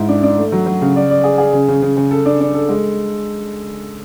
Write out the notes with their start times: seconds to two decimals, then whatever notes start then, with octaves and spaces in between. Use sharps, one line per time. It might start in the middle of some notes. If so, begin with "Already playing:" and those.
Already playing: G#2 E4
0.08 D4
0.23 D4
0.38 A3
0.52 F#3
0.66 F#3
0.81 C#3
0.96 D5
1.10 D5
1.24 G#4
1.38 G#4
1.53 C#3
1.68 C#3
1.82 C#3
1.97 C#3
2.11 A4
2.25 D4
2.40 D4
2.54 A4
2.69 G#3